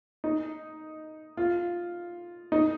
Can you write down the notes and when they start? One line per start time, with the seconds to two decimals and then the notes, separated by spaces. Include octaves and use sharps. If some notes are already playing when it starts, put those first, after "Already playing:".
0.24 D#4
1.37 F4
2.52 D#4